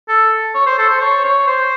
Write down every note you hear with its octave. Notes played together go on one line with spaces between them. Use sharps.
A4
C#5
C5
A4
C5
C#5
C#5
C5